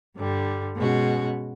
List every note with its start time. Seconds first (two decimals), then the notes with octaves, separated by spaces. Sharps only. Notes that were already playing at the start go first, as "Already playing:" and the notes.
0.16 G2 D3 G3
0.77 B2 G#3 C#4 F#4